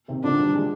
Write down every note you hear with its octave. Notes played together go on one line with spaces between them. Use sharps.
C3 D#3
D3 F3 D4
D#3 G3
F3 G#3